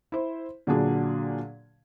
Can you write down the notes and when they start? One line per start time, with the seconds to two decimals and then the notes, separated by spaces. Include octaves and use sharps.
0.12 E4 C5
0.67 A#2 D3 F#3 D4 G#4